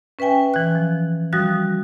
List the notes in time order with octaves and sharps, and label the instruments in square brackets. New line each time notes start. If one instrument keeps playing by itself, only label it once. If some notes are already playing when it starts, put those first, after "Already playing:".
[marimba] C#4 B4 E5 G5 G#5
E3 F#6
F3
F3 G3 F#4 D#6 F#6 A#6